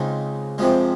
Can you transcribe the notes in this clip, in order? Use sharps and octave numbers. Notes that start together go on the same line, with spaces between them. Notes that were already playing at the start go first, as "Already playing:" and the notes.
Already playing: C#2 C#3 G#3 C4 D#4
F2 C3 F3 G#3